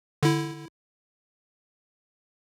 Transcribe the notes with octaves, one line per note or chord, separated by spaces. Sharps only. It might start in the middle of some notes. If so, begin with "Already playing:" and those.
D3 E4